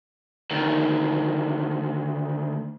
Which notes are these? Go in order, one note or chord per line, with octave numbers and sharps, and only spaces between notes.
D2 D#3